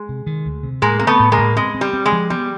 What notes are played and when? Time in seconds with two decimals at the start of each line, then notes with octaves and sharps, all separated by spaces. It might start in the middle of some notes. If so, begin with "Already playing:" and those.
Already playing: G#3
0.09 C3
0.26 D#3
0.46 D2
0.63 C3
0.82 A2 G#3 A#3
0.99 A#3 C4
1.07 A3 B3
1.19 A2
1.32 G#3 A#3
1.38 A2
1.56 G#3 C4
1.75 C4
1.81 G3
1.93 C4
2.06 G#3
2.12 F3
2.30 G3 B3